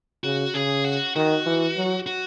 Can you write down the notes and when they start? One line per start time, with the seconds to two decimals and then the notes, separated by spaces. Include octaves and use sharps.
0.24 C#3 F#4
0.54 C#3 G#4
0.84 F#4
1.15 D#3 F#4
1.46 E3
1.76 F#3
2.07 F#4